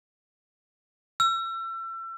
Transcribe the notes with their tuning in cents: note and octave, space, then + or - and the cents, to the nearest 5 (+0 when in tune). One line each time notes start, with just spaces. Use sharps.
E6 +35